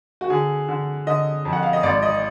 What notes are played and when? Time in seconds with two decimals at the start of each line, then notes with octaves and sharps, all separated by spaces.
0.21 F#4
0.30 D3 G#4
0.68 D3
1.07 D3 D#5
1.45 F2
1.53 F#5
1.63 F5
1.73 D#5
1.83 G#1 D5
2.03 D#5